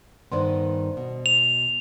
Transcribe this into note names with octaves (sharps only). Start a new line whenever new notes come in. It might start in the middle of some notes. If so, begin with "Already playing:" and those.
G2 D#3 B3 C5 D5 C6
B2
F7